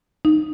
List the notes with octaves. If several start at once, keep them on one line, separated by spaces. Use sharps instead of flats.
D#4